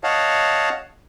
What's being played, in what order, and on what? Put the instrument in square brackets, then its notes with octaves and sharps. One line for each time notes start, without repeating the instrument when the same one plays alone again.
[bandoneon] C#5 D#5 F5 F#5 A5